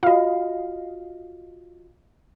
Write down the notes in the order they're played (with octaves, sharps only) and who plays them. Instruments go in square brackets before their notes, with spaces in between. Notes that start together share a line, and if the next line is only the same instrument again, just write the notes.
[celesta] F4 F#4 [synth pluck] D#5 F5